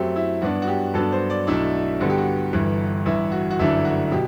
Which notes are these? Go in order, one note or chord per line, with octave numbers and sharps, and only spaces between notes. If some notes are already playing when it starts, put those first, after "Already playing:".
Already playing: F#2 F#3 A3 C4 G4
E4
G2 F#3 B3 D4 F#4
F#4
G4
G2 F#3 B3 D4 A4
C5
D5
B1 B2 A3 D4 E4
G2 D3 G3 B3 F#4
G4
F#4
G1 G2 E3
A1 G2 E3 E4
F#4
F#4
G1 F#2 E3 A3 D4 E4
F#4
B2 F#3 G4